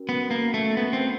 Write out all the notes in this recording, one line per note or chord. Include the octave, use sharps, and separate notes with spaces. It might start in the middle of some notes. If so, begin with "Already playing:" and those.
Already playing: C#4 F#4 A#4
B3
A#3
A3
B3
C4